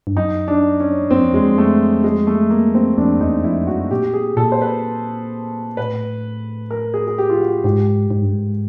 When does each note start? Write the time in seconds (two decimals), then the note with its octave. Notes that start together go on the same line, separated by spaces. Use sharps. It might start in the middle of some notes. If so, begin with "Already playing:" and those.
0.07 G2
0.17 F#2 D#4
0.48 D4
0.80 C#4
1.10 F#2 C4
1.21 F2
1.32 E2 G#3
1.43 F2
1.58 A3
2.04 G#3
2.27 A3
2.50 A#3
2.75 C4
2.97 F2 D4
3.20 E2 D#4
3.44 F2 E4
3.67 F#2 F#4
3.91 A#2 G4
4.14 G#4
4.37 A#2 A4
4.52 C5
4.61 B4
5.77 A2 B4
6.71 A#4
6.94 G#4
7.07 G#4
7.18 G4
7.30 F4
7.40 F#4
7.64 G#2 G4
8.11 G#2
8.22 G2
8.32 G#2